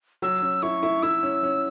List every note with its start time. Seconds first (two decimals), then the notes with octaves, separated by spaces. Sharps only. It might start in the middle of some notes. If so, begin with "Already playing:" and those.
0.22 F#3 E6
0.42 C#4
0.63 E4 C#6
0.83 E4
1.03 E4 E6
1.23 C#4
1.43 C#4